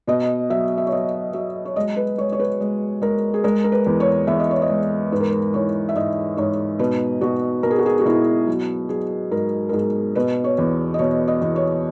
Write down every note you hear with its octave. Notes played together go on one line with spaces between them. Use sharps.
B2 D#5
F#3 E5
E5
C#5
F#3 D#5
F#3 E5
C#5
G#3 D#5
B4
G#3 C#5
C#5
B4
G#3
G#3 A#4
G#4
G#3 A#4
A#4
B4
E2
C#5
E2 E5
D#5
C#5
D#5
G#3
G#2 B4
A#4
B4
E3 C#5
E5
G#2 D#5
G#2 C#5
B2 B4
B2 F#4
B2 A#4
G#4
F#4
G#4
F#4
B2 E4
F#3
F#3 G#4
G#2 A#4
A#4
G#2 G#4
B2 B4
C#5
E2
D#5
B2 C#5
D#5
E2
C#5